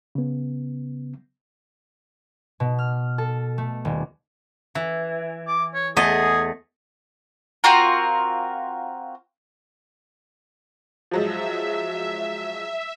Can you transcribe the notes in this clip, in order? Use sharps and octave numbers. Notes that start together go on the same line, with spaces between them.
C#3 B3
B2
F6
A4
A3
D#1
E3
D6
C#5
E2 A3 G#4 D#5
C4 F4 F#4 A#4
F3 F#3 G#3 E5